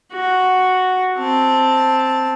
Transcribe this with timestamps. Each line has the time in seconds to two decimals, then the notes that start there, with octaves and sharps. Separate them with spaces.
0.13 F#4
1.18 C4 A5